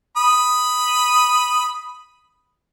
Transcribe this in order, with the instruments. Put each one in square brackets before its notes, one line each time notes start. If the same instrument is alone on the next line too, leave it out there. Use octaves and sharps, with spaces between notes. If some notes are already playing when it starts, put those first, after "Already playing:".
[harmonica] B5 D#6